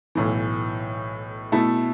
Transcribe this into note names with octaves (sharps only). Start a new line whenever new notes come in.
B1 A2 E3
B2 A3 E4 A4